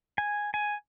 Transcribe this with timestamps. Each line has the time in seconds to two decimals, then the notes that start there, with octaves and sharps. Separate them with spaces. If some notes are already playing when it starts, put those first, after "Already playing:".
0.18 G#5
0.54 G#5